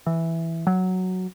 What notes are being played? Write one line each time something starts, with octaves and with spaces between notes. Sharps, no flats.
E3
F#3